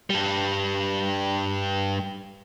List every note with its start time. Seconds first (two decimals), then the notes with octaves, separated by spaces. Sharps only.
0.10 G2 G3